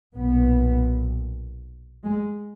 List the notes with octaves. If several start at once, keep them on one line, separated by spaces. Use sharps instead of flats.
B1 A#2 B3
G#3